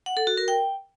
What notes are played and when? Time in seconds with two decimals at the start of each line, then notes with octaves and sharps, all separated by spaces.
0.06 F#5
0.17 A4
0.27 F#4
0.37 A#4
0.48 G5